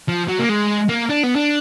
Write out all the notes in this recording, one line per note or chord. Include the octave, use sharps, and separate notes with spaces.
F3
F#3
A#3
G#3
A#3
D4
B3
D4